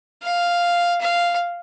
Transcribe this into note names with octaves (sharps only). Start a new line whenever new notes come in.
F5
F5